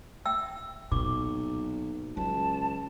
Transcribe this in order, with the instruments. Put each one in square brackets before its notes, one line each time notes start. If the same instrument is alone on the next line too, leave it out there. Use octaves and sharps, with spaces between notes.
[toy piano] E5 G5 E6
[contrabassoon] B1 [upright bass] A#2 [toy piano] C#6 D6
[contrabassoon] C#2 [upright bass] F#3 [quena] A5